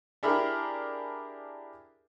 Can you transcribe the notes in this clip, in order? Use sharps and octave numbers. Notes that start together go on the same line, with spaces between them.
D4 E4 G4 G#4 A#4 B5